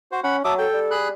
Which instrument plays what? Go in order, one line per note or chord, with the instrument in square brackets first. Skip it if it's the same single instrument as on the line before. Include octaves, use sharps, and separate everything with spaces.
[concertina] F#4 C5
[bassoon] C#4 [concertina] F#5 B5
[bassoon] F#3 [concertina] E5 D6 D#6 [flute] A5
[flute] A4 [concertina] G5
[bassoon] G3
[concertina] G#4 B5 F#6